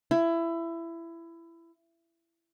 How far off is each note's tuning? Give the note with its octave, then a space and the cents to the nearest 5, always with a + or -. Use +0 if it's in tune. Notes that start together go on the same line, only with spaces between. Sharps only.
E4 +20